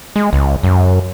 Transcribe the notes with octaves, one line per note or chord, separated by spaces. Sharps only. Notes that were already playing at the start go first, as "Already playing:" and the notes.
G#3
C#2
F#2